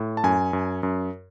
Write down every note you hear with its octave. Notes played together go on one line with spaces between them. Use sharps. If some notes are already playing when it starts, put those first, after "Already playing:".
Already playing: A2
A5
F#2 G#5
F#2
F#2